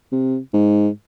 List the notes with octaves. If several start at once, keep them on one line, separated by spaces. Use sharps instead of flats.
C3
G#2